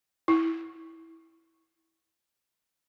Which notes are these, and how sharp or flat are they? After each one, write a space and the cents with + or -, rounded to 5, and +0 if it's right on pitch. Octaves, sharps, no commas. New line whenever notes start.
E4 -10